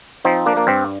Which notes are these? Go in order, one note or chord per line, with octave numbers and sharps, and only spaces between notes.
F3 C4 D#4
A#3 D4
A#3
G2 C4